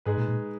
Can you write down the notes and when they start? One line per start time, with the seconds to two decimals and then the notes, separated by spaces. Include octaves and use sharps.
0.05 G#2 G#3 D#4 G#4 B4
0.17 A#2
0.28 A#2